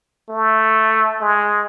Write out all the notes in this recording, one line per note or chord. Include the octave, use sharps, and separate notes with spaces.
A3
G#3